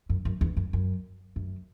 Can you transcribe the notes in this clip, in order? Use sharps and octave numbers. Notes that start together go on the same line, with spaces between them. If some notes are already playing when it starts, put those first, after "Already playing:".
F#2
F#2
E2
F#2
F#2
F#2